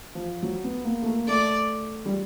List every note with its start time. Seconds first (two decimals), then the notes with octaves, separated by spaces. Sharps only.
0.15 F3
0.43 F#3
0.64 B3
0.85 A#3
1.03 A3
1.06 A#3
1.27 A3 D5
2.06 G3